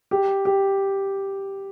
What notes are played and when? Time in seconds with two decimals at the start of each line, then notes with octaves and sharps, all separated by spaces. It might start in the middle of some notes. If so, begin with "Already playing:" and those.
0.11 G4
0.45 G4